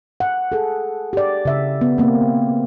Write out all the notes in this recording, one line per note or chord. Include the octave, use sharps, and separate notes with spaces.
F#5
G#4 A4
G4 D5
C#3 E5
B3
A#3 C4